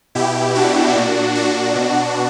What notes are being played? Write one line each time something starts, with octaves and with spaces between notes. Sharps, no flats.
B2 E4 G4
D4 F#4
A#2
D4 F#4
B2